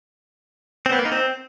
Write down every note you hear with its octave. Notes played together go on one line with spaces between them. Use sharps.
C4
B3
A#3
D#4
C4